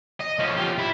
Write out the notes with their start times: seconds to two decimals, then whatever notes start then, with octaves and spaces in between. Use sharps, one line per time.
0.20 D#5
0.39 F3 C#4
0.58 F4 G4
0.78 E4